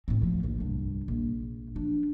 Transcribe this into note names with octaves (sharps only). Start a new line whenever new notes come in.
A2 C4
A2 F3
A#1 D#2
C2 G2
A#1
F3 D4